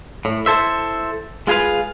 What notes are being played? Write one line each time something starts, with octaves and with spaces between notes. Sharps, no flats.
A2
E4 A4 C5 E5
G#3 F4 G#4 B4 F5